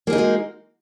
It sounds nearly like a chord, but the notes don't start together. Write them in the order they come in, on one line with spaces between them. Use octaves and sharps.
A#3 G#4 D#4 F#4 G#3